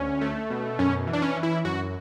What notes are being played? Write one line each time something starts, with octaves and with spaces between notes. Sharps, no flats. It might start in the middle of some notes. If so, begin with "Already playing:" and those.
Already playing: D2 C#4
A3
B2
F#2 C#4
E3
D4
C#4
E3
E4
F#2 F#4